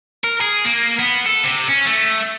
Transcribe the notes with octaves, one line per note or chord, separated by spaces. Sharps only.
A#4
G#4
A#3
B3
A4
C3
C#4
A3